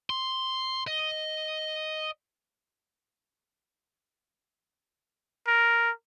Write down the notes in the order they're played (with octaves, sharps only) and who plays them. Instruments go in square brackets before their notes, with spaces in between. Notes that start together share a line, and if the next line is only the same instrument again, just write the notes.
[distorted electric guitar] C6
D#5
[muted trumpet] A#4